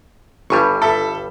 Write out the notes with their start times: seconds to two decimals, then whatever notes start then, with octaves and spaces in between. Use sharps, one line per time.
0.50 G1 G2 G3 G#5 C#6
0.82 A4 E5